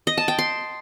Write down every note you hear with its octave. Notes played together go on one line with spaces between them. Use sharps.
D#5
A5
G5
C6